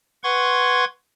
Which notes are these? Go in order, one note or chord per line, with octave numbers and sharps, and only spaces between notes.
B4 F#5 C6 C#6 G#6